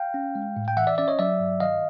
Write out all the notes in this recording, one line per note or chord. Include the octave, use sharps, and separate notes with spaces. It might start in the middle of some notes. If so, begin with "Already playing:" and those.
Already playing: F5 G5
C#4
G#3
A2
G5
E3 E5 F#5
D5 E5
C#4 D5 E5
C#5 D#5
F#3 D5 E5
G2
D#3 D#5 F5